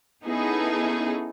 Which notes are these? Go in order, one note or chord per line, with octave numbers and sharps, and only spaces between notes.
B3 C#4 D#4 E4 G#4 A4